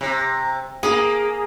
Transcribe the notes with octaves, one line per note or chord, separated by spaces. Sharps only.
C3
A#3 G#4